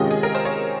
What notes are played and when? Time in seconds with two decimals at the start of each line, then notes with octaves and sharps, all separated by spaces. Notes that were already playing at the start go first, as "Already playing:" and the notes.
Already playing: C3 D#3 G#3 C#4 F4 D#5
0.11 G#4
0.23 A#4
0.35 C5
0.45 C#5